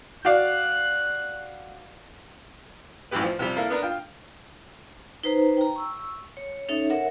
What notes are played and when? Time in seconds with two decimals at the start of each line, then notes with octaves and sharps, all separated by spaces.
0.25 F#4 D5 F5 F#6
3.11 A1 F#2 A2 E3 G4 B4
3.24 F3
3.39 C3 F3 G3
3.56 A#3 E4 A4 A#4 F5
3.70 B3 D4 A#4
3.82 F4 G5
5.23 D#4 B4 C5 A#5
5.57 G5 A#5
5.76 C#6 E6
6.37 C#5
6.69 C#4 D#4 A4 C#5 E5
6.90 A#4 C#5 E5 F#5